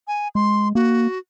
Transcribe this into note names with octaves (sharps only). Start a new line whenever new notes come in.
G#5
G#3 C6
A#3 F#4